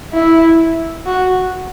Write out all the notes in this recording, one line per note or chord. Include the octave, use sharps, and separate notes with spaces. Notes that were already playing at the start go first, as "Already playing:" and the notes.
E4
F#4